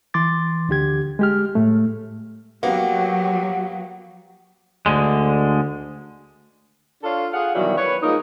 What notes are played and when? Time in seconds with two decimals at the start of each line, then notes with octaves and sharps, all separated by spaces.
0.14 E3 C6 D6 A6
0.69 D2 D3 G4 G#6
1.19 G#3 G4 F6
1.55 A2 A3
2.63 F#3 A#3 B3 F#4 G4 F#5
4.86 D2 D3 G#3
7.03 D4 F4 A4 C#5 F5
7.32 F4 G#4 F5 F#5
7.55 B2 D#3 E3 F#3 G3
7.76 B4 C#5
8.03 F3 G#3 A#3 D#4 A#4